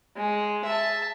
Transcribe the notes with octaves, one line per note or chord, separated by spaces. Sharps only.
G#3
E5 A5